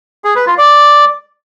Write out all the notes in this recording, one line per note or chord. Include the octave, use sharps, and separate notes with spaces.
G#4
B4
F4
D5